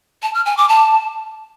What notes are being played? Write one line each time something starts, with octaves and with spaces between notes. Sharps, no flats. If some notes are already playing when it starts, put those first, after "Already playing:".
A5
F6
G#5
D6
A5